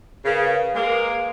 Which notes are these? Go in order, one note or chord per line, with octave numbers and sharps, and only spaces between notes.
C#3 A#4 B4 F5
G#3 A#3